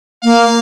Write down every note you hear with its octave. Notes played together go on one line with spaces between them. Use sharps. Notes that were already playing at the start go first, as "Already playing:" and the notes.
A#3 F5